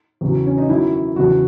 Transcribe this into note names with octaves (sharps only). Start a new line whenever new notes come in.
E2 C#3 F#3
C#4
D#4
F#2 D#3 F#3 E4
E2 C#3 F#3 F#4